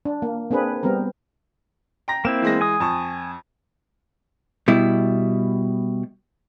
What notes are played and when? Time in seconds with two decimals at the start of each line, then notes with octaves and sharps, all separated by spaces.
0.05 D4
0.22 A#3
0.51 A#3 C4 D4 G#4 B4
0.83 G3 B3 C4 A#4
2.08 G5 A#5 A#6
2.25 A#3 C4 E4 E7
2.42 E3 G#3 A#6
2.61 G#5 D#6
2.80 F2 A5 C#6
4.68 B2 G3 E4